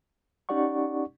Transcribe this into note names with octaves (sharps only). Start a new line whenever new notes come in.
C#4 D#4 G4 D5 F#5 C#6